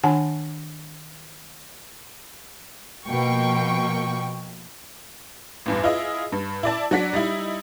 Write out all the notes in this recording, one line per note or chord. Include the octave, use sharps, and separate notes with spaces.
D#3 D4 F#5 G#5 A5
B2 F3 A#3 G5 C#6
A1 E2 G2
E4 F4 G#4 D#5
G2
E4 D5 A5
F#3 D4 F#4 D5 B6
G3 D#4 E4